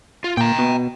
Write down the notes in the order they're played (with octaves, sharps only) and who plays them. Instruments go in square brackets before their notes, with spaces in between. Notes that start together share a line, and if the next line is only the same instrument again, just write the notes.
[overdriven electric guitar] F4
[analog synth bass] A#2 [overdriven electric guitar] G5 A#5
[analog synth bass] B2